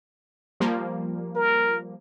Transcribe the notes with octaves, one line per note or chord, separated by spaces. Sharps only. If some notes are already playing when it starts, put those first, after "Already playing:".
F3 G3 A#3
A#4